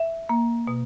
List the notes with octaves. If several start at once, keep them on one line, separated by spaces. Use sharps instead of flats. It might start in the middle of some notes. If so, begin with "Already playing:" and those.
Already playing: E5
A#3
B2